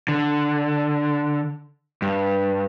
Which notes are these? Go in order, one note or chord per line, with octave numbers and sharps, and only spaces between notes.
D3
G2